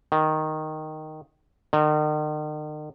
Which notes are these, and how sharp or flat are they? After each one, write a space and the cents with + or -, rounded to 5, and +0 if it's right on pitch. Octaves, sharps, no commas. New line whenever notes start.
D#3 +0
D#3 -40